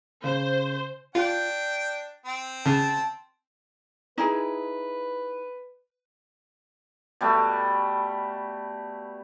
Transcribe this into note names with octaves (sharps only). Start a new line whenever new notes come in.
C#3 C5
D4 F4 G5
C4
C#3 A5
D#4 E4 G#4 B4
B2 G3 A3